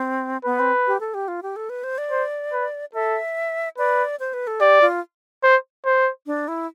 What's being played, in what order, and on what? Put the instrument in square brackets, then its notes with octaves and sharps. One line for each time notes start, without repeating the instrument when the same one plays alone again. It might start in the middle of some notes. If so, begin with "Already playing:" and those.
Already playing: [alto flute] C4
[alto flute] B3 [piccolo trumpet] B4
[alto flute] C4
G4
A4
G4
F4
G4
A4
B4
C5
D5
[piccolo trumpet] C5
B4
[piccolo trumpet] A4 [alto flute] E5
[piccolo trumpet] B4 [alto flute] D5
[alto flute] C5
B4
A4
[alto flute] G4 [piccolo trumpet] D5
[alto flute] F4
[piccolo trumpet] C5
C5
[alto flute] D4
E4